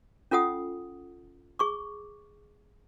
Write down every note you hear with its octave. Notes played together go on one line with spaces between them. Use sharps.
C#4 F4 A4 F#5 D#6
G#4 C#6 D6